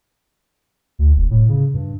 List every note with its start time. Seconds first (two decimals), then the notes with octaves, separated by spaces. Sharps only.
0.99 D2
1.16 E1
1.31 A2
1.49 C#3
1.74 G2